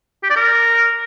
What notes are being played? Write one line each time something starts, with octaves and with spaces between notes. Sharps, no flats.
G4
D5
A#4